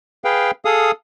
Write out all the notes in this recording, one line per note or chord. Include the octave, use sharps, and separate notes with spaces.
G#4 B4 F5 G5
G#4 A4 F5 D#6